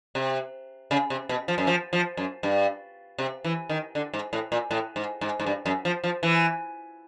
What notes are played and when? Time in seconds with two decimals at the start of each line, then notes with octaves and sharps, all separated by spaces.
0.15 C3
0.91 C#3
1.10 C3
1.29 B2
1.48 F3
1.58 F#2
1.67 F3
1.93 F3
2.17 F#2
2.43 G2
3.18 C3
3.44 E3
3.69 D#3
3.95 D3
4.14 G#2
4.33 A2
4.52 A#2
4.71 A2
4.96 G#2
5.21 G#2
5.40 G#2
5.46 G2
5.66 F#2
5.85 F3
6.04 F3
6.23 E3